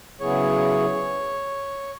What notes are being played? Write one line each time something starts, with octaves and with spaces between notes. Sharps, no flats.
C#3 F#3 B3 E4 G#4 C#5